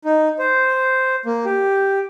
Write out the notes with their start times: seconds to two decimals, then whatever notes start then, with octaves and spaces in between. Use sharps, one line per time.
0.05 D#4
0.39 C5
1.26 A#3
1.45 G4